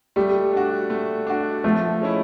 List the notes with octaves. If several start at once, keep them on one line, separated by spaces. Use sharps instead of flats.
G3 A3
D4 F#4
A3
D4 F#4
F3 A3
G#3 C#4 E4